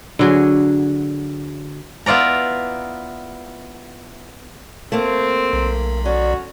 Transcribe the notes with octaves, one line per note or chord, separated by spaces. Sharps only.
D3 F#3 G#4
B3 E4 F4 D5 A#5
A3 A#3 C4
B1
C#4 F#4 D5